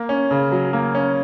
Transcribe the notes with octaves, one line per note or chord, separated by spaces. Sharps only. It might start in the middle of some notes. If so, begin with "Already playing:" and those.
Already playing: A#3
C#4
C#3
F#3
A#3
C#4